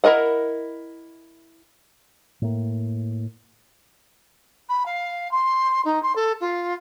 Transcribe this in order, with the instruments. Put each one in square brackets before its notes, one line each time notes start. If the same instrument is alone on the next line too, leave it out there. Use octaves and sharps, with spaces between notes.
[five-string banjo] E4 F4 A#4 D#5 F#5
[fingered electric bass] A2 A#3
[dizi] B5
F5
C6
D#4
C6
A4
F4